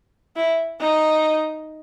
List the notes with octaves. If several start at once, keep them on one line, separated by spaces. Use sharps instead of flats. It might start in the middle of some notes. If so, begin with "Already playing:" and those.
E4
D#4